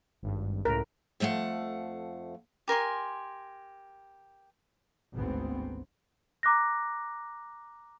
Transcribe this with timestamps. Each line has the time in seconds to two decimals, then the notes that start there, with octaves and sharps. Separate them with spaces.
0.22 G#1 G2
0.65 C#2 A2 A#4
1.20 F2 F3 A3 F5 F#5
2.68 G4 A#4 G#5 C6
5.14 G#1 D2 G#2 B3 C4
6.43 A#5 D6 F#6 A#6